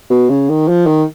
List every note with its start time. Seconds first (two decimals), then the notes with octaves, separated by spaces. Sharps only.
0.10 B2
0.29 C#3
0.49 D#3
0.68 F3
0.87 D#3